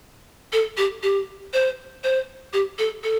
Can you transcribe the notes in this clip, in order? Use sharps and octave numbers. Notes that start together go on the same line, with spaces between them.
A4
G4
G4
C5
C5
G4
A4
A4